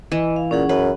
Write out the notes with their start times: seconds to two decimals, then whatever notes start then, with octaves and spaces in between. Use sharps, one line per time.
0.12 E3 D#5
0.36 F5
0.51 A#2 C#4 G#4 F#5
0.69 F#2 B4